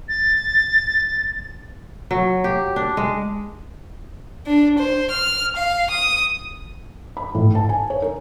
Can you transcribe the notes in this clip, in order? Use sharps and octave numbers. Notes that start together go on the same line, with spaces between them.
A6
F#3
G4
D4
G#3
D4
C5
F6
F5
D#6
B5
A2
A5
G#5
C#5
A#4